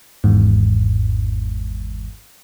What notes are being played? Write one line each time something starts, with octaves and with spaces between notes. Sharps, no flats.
G#1 E2 G#2